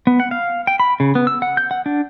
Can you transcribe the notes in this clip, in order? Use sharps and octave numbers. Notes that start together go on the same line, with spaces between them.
B3
F#5
F5
G5
B5
C#3
B3
E6
F#5
G6
F#5
D4